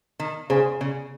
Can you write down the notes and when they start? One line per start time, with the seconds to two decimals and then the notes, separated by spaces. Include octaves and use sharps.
0.20 D#3
0.50 C#3 G#4 C5 F5 G#5 C6
0.81 C#3